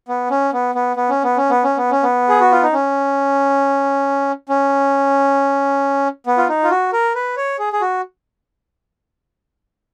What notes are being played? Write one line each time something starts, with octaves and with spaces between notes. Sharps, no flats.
B3
C#4
B3
B3
B3
C#4
B3
C#4
B3
C#4
B3
C#4
B3
G#4
F#4
F4
D#4
C#4
C#4
B3
F4
D#4
F4
F#4
A#4
B4
C#5
G#4
G#4
F#4